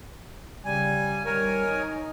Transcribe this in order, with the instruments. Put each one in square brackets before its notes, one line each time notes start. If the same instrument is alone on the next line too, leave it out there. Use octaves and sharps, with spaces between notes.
[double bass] C#3 [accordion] G3 G#5
[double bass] D#3 G3 [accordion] A#4 C#5 G#5
[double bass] D#4